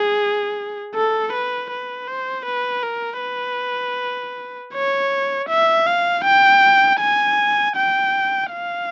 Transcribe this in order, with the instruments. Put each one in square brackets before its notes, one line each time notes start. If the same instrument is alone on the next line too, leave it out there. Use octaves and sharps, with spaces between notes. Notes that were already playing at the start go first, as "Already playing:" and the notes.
Already playing: [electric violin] G#4
A4
B4
B4
C5
B4
A#4
B4
C#5
E5
F5
G5
G#5
G5
F5